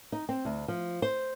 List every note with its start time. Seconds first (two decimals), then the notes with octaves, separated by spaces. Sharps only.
0.12 D#4
0.29 C4
0.45 D2
0.68 F3
1.02 C5